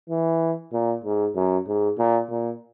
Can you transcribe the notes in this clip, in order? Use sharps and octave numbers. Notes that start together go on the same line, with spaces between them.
E3
A#2
G#2
F#2
G#2
A#2
A#2